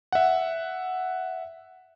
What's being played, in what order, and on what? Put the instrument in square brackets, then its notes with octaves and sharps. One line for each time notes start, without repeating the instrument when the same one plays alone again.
[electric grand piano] E5 F#5